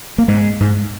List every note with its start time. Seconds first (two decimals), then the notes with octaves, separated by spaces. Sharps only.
0.18 A#3
0.28 G#2 G#3
0.60 G#2